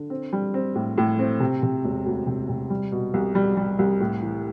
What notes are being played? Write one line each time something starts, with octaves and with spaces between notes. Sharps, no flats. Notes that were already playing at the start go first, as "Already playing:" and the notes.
Already playing: D3
C4
G3
C4
A2
A2
C4
C3
C3
E1
D2
C3
C3
G3
B2
C2
G3
G3
C2
A2
E3